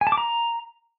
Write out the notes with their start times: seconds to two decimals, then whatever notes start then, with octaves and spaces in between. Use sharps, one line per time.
0.01 G#5
0.07 A5
0.12 D6
0.18 A#5